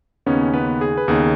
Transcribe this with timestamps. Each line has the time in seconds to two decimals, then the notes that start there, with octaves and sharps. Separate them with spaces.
0.26 D#2 C#3 B3 C#4 D#4 C#5
0.54 B3 B4
0.81 G#4
0.97 B4
1.08 D#2 C#3 B3 D#4 G#4